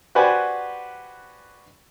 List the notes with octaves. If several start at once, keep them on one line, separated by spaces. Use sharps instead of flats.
F#4 G4 B4 C5 D5 G#5